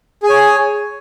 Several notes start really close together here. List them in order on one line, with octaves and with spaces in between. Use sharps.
G#4 G#5 C#5